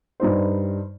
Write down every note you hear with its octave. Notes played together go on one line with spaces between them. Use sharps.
G2 G3 D#4 C5